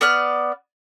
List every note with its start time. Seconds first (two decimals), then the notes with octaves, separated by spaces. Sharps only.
0.01 B3 D5 F6 F#6